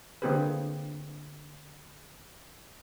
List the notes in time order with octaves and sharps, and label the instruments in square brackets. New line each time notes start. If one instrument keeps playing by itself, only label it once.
[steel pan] D3 A#3 C4 G4 G#4 B4